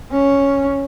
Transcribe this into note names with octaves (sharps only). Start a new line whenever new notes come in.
C#4